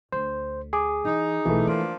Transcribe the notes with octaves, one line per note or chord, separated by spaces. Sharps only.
D2 C5
G#4 D6
E3 D#4
B1 E3 A3
F3 A#3 D4 F4